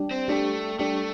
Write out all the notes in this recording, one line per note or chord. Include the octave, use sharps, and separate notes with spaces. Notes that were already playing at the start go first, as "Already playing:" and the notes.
Already playing: G3 D4 G4
C4
G3 A3 D4 G4
G3 A3 D4 G4